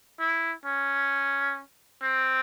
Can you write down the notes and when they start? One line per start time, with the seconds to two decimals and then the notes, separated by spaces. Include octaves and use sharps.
0.20 E4
0.65 C#4
2.02 C4